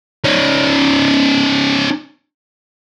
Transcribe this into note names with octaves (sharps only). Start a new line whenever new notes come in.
C#4 D#4